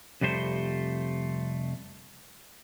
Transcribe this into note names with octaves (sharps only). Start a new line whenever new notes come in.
F2 C3 G3 A3 C5